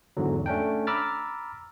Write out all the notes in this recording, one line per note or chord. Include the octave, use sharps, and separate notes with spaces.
E2 G#2 D3 F#3
A3 C#4 D4 G5
A#5 B5 D6 E6 F6 A6